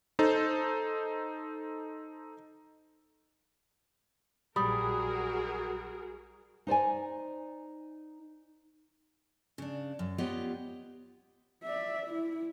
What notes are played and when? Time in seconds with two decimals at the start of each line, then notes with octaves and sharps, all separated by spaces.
0.19 D#4 A4 C5
4.56 A#1 F#3 G3 F#4 G#4 A#4 B5 D#6
6.67 D#4 C5 D5 G#5
9.58 C#3 D4
9.99 F#2
10.18 B3 F4 G4 C#5 D#5
11.63 D5 E5
12.06 E4